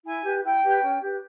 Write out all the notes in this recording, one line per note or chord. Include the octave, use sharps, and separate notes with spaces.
E4 G#5
G4 B4
E4 G5
G4 B4
C#4
G4 B4